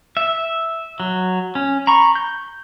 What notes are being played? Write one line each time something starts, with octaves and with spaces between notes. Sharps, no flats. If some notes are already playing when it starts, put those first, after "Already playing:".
E5
F#3
C#4
A#5 B5 C#6
G6